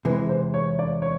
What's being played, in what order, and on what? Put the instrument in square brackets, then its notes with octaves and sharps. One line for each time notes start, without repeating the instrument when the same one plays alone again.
[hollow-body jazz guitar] E2 C3 E3 G#3 [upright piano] B4
[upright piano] C5
C#5
D5
C#5